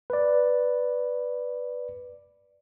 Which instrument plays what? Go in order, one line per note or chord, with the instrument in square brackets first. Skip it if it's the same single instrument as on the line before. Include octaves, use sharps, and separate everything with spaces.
[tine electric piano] B4 D5